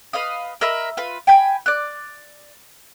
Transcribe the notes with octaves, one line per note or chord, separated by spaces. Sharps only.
B4 D#5 F5 D#6
A#4 D#5 E5 B5
F4 B4
G5 G#5 B5 G6
D5 F#6